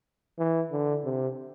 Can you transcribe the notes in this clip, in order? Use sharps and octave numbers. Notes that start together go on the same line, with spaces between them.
E3
D3
C3